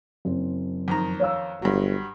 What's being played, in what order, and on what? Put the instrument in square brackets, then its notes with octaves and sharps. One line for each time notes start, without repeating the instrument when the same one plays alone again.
[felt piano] F#1 C4
[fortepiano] F2 D#3 A#5
[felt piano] C#5 F5 E6
[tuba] G1 [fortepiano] G2 F#3